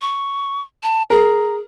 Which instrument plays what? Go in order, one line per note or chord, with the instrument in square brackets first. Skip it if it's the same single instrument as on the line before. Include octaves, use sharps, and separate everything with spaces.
[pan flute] C#6
A5
[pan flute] G#4 [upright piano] A#4